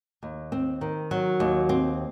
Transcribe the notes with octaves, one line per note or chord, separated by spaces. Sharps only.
D#2
C4
D#3
F#3
D#2
C4